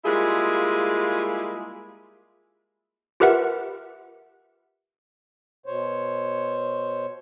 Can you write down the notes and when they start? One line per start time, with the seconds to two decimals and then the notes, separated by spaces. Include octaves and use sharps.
0.05 G3 G#3 A#3 E4 F4 G#4
3.20 F4 G4 A#4 B4 E5 F#5
5.66 B2 C5 C#5